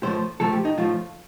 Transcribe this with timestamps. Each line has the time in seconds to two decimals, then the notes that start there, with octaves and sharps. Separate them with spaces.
0.03 A2 F3 A3 C5
0.40 A2 F3 A3 A4
0.52 G4
0.65 D#4
0.78 A2 F3 A3 F4